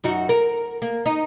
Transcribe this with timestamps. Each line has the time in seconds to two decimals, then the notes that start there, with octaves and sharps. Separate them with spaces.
0.04 F#2 D#4 F#4
0.29 A#4
0.82 A#3
1.06 D#4